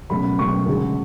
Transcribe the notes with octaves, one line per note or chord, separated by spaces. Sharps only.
C#2 B2 F#3 A3 B5
C#2 B2 F#3 A3 C#6
D2 C#3 G#3